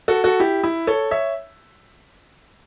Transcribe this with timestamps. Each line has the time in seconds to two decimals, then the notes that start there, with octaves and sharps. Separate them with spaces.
0.08 F#4 A4
0.24 F#4 A4
0.40 E4 G4
0.64 E4
0.87 A4 C#5
1.11 C#5 E5